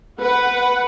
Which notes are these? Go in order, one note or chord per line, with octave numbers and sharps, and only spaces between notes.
B4 F#5